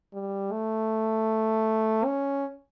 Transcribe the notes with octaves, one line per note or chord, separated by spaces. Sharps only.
G3
A3
C#4